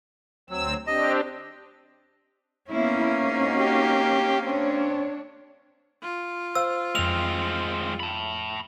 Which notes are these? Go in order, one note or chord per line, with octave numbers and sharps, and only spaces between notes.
D2 F#3 C4 E6
C4 D4 G4 D#5
A#3 B3 C#4 E4
G#2 C4 D#4 F#4
G4
C4 D4 C#5
F4
C5 F5 E6
F2 G#3 C4 F6 F7
A5 B5